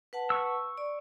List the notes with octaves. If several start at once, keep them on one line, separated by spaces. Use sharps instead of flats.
B4 F#5 A5
C#6 E6
D5